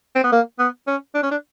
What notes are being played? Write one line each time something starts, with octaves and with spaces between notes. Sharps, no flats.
C4
B3
A#3
B3
C#4
D4
C#4
D4